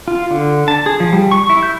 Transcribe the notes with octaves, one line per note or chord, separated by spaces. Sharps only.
F4
D3
A5
G#4
F3
G3
C#6
E4
G6